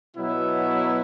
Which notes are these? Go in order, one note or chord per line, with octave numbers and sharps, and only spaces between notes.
B2 F#3 B3 E4